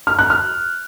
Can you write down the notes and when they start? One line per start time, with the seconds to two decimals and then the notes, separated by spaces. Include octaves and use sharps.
0.07 F6
0.19 F#6
0.30 F6